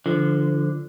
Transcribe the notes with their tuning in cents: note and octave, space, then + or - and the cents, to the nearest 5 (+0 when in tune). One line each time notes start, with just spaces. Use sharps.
D3 +0 F3 -25